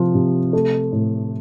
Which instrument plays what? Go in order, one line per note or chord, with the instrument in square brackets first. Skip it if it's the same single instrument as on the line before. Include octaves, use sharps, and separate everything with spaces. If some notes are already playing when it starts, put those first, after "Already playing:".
Already playing: [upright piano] C3 F3
C3
A3
A2